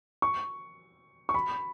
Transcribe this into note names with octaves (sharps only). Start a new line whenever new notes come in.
C#6
C#6
B5